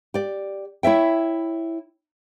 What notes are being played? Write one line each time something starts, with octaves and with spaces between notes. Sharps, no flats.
G4 D5
E4 C#5 E5 G5